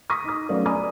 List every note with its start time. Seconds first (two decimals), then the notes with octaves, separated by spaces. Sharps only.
0.10 C#6 D#6 A#6 B6
0.24 D#4 D#6
0.49 F#3 A3 B3 C#4 D5 F5
0.66 D5 G#5 A#5 B5 D#6